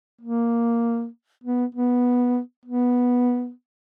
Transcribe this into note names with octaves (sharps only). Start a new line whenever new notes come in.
A#3
B3
B3
B3